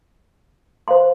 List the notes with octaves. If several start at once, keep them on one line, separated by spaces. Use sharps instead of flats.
C5 F5 C6